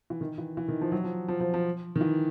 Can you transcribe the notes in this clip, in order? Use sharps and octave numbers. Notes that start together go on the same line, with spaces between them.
E3
D#3
E3
E3
D#3
F3
F#3
F3
F3
F3
F3
D#3
E3